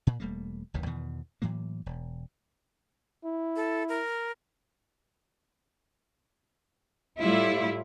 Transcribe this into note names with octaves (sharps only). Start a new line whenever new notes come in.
A#2
E1 G3 A3 A#3
F#1 D#2 D#3 E3
E2 B2 D#3 E3
A2 E3 F#3 A#3
E1
E4
A4
A#4
A2 G3 E4 F4